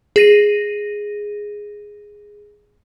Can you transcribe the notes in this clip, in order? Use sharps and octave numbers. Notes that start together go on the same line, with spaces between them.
G#4 A#6 D#7